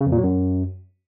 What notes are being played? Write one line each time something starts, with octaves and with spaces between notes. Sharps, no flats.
C#3
F2
A#2
F#3
F#2